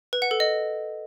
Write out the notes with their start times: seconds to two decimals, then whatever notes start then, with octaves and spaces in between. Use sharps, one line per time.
0.13 B4
0.22 F#5
0.31 A4
0.40 D#5